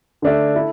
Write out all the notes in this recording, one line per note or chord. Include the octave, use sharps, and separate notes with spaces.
D3 A3 D4 A4 E5
E4 A4